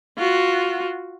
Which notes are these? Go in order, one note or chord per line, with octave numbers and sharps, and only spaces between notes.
F4 F#4